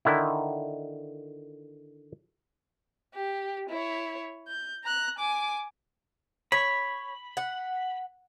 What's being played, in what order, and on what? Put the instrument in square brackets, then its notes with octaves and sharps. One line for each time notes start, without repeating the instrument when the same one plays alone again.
[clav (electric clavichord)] D3 D#3 E4
[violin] G4
E4 C#5
G6
A#5 F#6
G#5 D6
[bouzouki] C#5 [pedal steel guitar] B5
[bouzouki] F#5